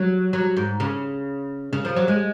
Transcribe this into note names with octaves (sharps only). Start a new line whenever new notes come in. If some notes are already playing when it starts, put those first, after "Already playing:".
Already playing: F#3
F#3
G#2
C#3
C#3
F3
F#3
G#3